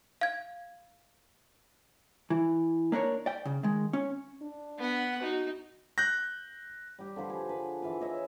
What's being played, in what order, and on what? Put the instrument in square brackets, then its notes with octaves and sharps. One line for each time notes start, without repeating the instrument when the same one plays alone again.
[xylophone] F5 G#6
[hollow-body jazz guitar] E3
A#3 D4 A#4 C#5
D5 G5
C#3
D#3 G#3
C#4
[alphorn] D4
[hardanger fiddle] B3 F#5
[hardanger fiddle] D#4 [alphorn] F#4
[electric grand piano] F#6 G6 A#6
[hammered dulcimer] G3 G4
D3 F3 B4 C5
G#4
B4 B5
E3 F4 B4
C#5 D#5 E5 G#5